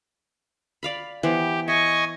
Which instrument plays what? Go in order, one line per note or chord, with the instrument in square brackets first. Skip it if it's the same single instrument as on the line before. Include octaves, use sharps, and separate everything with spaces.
[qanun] D5 F5 B5
[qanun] E3 B3 C5 [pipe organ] G4
[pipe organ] D#5 G#5 C#6 [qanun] E5